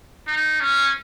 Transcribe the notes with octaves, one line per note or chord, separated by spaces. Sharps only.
D#4
C#4